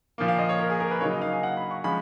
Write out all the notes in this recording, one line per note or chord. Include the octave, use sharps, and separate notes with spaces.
A#2 F3 A#3
F5
D#5
C#5
A#4
G#4
A#4
B4
C#3 F#3 A#3 D#4 C#5
D#5
F5
G#5
F#5
B5
C#6
F3 G#3 C#4 B5